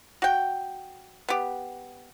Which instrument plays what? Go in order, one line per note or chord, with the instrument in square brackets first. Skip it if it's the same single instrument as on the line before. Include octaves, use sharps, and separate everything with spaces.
[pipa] F#4 G5
B3 G4